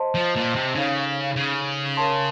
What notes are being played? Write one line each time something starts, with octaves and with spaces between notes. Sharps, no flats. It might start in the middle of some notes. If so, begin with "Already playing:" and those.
Already playing: C5 D#5 A5 C6
F3
A#2
C3
C#3 D#4 A4 C#5 F5
C#3
A#4 C#5 A5 C6